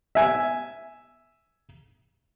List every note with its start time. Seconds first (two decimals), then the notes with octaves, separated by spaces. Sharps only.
0.15 E5 G#5